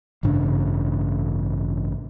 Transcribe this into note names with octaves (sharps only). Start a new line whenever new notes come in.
A1 G2 C#3 D4